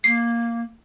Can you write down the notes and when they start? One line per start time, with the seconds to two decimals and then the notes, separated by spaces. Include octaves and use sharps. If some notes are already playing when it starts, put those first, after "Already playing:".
0.04 A#3 C7